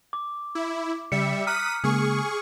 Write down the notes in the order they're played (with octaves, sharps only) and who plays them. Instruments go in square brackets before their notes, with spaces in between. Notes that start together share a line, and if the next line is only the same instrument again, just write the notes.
[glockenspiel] D6
[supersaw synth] E4
[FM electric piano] C#3 [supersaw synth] G3 E5 [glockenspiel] C#7
[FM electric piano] A#5 F#6 [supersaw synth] D#6 B6 D#7 [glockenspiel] F6
[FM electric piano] C#3 G#3 A#3 [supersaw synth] G#4 C#6